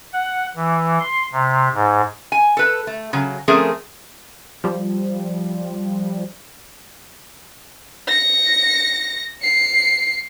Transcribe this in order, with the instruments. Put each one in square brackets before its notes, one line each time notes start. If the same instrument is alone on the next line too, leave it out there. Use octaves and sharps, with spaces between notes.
[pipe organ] F#5
E3
C6
C3
G#2
[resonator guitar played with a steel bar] G#5
A4 B4 A5
A3
C#3 F#3
F3 A3 C4 C#4 G#4 A#4
[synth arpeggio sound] F3 G3
[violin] A#6 C#7
C7 C#7